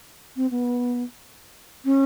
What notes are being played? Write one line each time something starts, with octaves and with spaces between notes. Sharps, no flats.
C4
B3
C#4